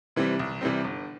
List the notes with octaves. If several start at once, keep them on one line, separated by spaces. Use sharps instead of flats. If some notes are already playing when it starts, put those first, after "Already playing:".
C3 E3 G3 C4
C2
C3 E3 G3 C4
G1